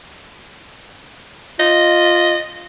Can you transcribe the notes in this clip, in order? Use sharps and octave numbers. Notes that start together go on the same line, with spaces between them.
F4 D#5